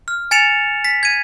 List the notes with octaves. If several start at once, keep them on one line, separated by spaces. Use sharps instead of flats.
F6
G#5 A6 C#7 E7 F7
B6
G#6 D#7